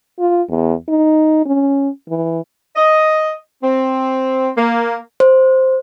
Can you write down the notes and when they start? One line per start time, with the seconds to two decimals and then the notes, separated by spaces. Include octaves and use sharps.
0.19 F4
0.50 E2
0.89 D#4
1.46 C#4
2.09 E3
2.75 D#5
3.63 C4
4.56 A#3
5.20 C5